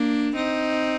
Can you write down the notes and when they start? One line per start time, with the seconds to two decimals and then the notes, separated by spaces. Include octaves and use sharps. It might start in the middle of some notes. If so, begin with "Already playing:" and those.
Already playing: A#3 D4
0.35 C4 D#4